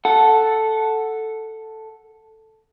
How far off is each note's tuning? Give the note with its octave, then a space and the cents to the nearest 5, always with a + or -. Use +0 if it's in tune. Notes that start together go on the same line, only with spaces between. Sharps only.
A4 +0 F#5 +0